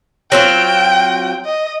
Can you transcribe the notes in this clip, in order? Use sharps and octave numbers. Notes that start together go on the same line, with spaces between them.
F#3 C4 F4 G5
D#5